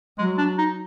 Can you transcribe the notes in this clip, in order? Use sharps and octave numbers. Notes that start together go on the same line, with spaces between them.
F#3 G#3
D4
D#4